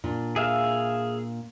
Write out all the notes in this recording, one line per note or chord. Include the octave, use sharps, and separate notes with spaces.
A#2 D4 F4
G#4 E5 F5